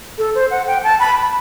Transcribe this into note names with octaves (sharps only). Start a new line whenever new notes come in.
A4
C5
F#5
G5
A5
B5